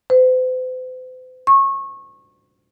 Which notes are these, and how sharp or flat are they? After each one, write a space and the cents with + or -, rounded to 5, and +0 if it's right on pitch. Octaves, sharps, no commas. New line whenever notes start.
C5 -45
C#6 -25